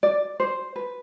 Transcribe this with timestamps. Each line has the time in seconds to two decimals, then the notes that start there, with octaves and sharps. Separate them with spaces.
0.03 D5
0.40 C5
0.76 B4